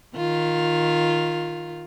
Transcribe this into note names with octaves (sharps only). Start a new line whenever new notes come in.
D#3 F4